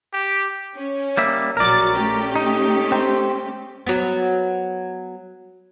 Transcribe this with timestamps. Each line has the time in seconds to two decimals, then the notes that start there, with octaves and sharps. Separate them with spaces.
0.13 G4
0.75 C#4
1.17 G3 A#3 E5
1.57 A#1 F#3 A#4 D5 A6
1.95 A3 C#4 G4
2.36 D#4
2.92 C4
3.87 F#3 B3